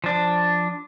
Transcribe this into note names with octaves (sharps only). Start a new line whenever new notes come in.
F3 D4